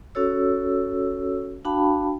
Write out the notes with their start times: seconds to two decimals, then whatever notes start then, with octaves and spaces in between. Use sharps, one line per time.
0.15 C#4 F#4 A4 C#5 E6
1.65 D4 F#4 F5 G5 A5 B5